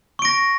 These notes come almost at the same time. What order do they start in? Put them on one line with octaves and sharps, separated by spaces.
C#6 D7 A#6